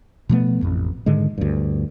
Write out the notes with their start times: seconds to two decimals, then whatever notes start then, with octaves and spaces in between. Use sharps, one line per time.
0.29 B2 F3 A3 B3
0.62 A1 F2
1.06 G#2 D3 D#3 G#3
1.38 D2 G2